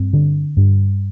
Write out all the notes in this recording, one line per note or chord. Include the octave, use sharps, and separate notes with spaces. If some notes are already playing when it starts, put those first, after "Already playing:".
Already playing: G2 C4
D3
G2